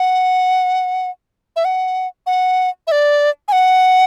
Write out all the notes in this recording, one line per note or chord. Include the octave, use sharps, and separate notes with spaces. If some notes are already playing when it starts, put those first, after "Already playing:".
Already playing: F#5
E5
F#5
F#5
E5
D5
G#5
F#5